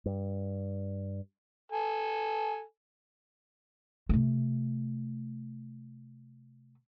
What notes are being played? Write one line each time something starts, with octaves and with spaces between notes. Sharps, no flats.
G2
A4 G#5
C3 A3